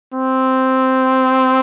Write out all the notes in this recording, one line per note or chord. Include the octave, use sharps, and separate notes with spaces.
C4